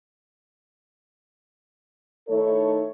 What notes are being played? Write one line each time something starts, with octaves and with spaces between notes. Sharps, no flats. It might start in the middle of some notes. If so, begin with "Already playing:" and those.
D#3 A3 D#4 E4 A4 C#5